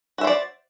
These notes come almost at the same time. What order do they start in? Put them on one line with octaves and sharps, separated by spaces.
F#4 E5 C5 D5